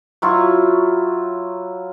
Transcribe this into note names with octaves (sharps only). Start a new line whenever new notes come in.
F#3 E4 F4 C#6